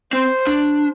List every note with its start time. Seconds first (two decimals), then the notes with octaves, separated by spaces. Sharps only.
0.13 C4 C5
0.47 D4